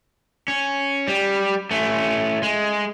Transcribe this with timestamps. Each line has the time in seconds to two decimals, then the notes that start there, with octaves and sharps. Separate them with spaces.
0.48 C#4
1.08 G3
1.71 A3 C#4
2.43 G#3